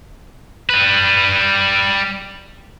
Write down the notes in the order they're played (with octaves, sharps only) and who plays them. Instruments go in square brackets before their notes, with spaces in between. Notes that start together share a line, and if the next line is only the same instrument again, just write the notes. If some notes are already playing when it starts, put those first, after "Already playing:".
[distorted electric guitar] G3 B4